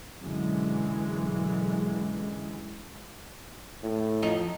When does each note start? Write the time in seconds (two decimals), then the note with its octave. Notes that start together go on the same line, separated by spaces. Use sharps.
0.20 F#2 B2 D3 E3 G#3
3.83 A2
4.22 F2 D#5 A#5